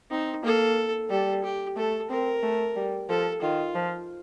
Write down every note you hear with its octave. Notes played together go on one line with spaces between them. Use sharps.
C4 D#4
A#3 A4
G3 A4
G4
A3 A4
C4 A#4
A3
G3
F3 A4
D#3 F4
F3